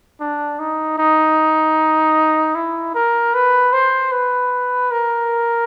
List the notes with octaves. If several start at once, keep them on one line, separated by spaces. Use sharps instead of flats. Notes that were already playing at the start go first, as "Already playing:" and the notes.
D4
D#4
D#4
E4
A#4
B4
C5
B4
A#4